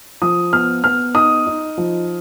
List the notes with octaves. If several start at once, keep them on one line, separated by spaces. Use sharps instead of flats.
F3 D#6
B3 F6
B3 F6
D#4 D#6
D#4
F3